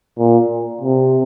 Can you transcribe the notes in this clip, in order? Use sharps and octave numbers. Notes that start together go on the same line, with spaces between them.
A#2
C3